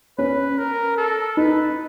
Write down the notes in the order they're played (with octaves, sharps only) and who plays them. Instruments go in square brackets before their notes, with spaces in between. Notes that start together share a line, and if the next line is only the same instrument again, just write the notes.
[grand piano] C#4 [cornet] B4
[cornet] A#4
A4
[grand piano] D#4 [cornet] B4